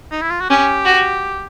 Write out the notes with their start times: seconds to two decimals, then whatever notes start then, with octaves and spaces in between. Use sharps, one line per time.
0.12 D#4
0.21 E4
0.31 F4
0.41 F#4
0.50 C#4 G4
0.85 F#4